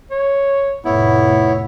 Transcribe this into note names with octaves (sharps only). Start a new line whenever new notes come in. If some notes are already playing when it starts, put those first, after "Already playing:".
C#5
F1 A2 B3 E4 C#5